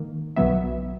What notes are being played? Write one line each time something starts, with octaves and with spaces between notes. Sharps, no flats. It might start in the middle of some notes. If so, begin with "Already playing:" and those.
Already playing: G#2 D#3 A#3
B1 B2 F#3 B3 E5